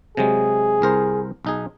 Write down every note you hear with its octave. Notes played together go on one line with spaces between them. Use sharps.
C3 F#3 G#3 G#4
C2 A#4 C5
B1 D#4 G#4